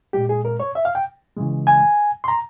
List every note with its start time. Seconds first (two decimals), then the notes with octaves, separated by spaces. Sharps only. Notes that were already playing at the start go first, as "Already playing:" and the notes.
0.13 A#2 G#3 G4
0.29 G#4
0.45 A#4
0.60 C#5
0.75 E5
0.85 F5
0.95 G5
1.36 C#3 E3 G#3
1.67 G#5
2.24 C6
2.28 A#5